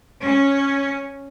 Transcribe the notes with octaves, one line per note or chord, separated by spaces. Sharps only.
C#4